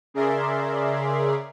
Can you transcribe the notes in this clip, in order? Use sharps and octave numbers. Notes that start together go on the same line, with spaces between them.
C#3 G#4 A#4 D5 E5 C6